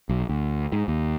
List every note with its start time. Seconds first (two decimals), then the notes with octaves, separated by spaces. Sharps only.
0.09 B1
0.29 D2
0.72 G#2
0.88 D#2